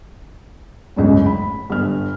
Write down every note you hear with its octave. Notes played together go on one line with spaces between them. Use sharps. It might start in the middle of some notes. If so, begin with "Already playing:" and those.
G1 C#2 F#2 A2
B5
G1 F6